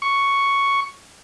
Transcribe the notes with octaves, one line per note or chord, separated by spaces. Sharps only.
C#6